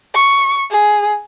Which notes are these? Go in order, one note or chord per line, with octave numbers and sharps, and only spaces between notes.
C#6
G#4